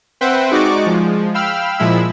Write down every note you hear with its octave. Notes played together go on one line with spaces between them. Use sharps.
C4 B4 C5 E5 F#5 G5
G#3 D#4 F#4 D5 C#6 D6
F3 G#3
F5 G5 B5 E6 F6
A#2 F3 G#3 E4 B5 E6